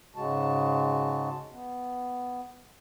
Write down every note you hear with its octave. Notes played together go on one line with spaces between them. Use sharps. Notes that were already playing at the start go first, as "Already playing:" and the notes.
G#2 C#3 G#3 F#4 A5
B3